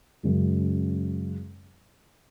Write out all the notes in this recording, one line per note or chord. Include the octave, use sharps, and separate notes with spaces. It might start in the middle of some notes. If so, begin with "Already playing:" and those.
F#2 C#3 G#3